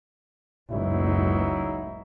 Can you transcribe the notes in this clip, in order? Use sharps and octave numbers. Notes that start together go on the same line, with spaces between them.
F#1 C#2 A2 F#3 D#4 E4